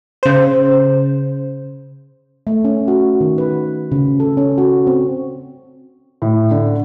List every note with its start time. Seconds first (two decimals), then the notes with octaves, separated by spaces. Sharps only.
0.23 C#3 C5
2.47 A3
2.65 C#4
2.88 F#4
3.21 D#3
3.38 B4
3.92 C#3
4.20 A4
4.37 C#4
4.58 F#4
4.87 C4
6.22 A2
6.51 D3